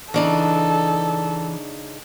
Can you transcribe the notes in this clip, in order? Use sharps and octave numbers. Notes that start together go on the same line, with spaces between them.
C#3 E3 D4 D#4 A4